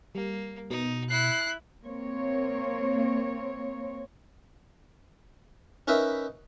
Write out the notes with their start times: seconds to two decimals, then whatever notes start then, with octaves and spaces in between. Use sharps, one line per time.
0.15 G3 A#3
0.71 B2 D#4
1.10 E4 F#6 C7
1.84 A#3 C4 C#5
5.88 C#4 D#4 A#4 B4 E5